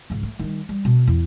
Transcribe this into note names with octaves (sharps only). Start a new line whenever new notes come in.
C#2 G#2
A3
D#3 G3
G3
B2
E2